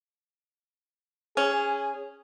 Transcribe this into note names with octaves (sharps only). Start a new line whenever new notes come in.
C#4 G#4